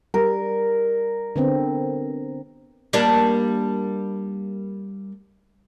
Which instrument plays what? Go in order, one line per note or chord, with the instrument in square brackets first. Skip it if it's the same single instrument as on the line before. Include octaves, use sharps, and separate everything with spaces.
[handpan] G3 [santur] A#4
[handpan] D3 B3 C4
[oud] G3 A#3 D4